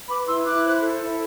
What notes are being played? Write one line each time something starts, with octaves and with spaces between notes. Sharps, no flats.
B4 B5 D6
E4 C6 E6
E4 D6 F#6
C5
A4
E4